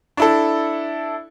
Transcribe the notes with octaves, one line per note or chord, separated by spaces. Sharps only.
D4 E4 A4